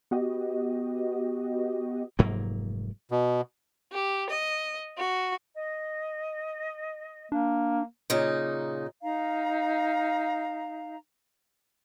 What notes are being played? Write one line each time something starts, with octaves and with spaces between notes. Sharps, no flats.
B3 F#4 G4 D#5
F1 G#2 F#3 A#3
B2
G4
D#5
F#4
D#5
A#3 D4
A#2 C#3 D#4
D#4 F5 A#5